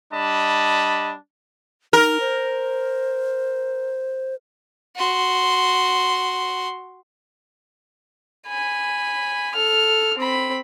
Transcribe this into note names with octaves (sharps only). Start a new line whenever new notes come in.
G3 D4 D#5 A5 B5
D#4 A#4
C5
F#4 C6
G#5 B5
A4 F6
C4 B5